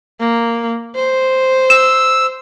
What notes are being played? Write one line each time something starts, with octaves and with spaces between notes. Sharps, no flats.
A#3
C5
E6 E7